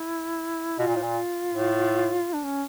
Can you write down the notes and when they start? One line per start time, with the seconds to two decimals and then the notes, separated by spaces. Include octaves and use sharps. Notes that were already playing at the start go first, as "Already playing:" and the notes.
Already playing: E4
0.79 B2 F4
0.87 A#2
0.96 A2
1.03 A#2
1.53 A2
2.33 D4
2.44 C#4